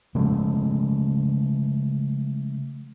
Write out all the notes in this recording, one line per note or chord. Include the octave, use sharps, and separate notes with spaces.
C#3 F3 G#3 A3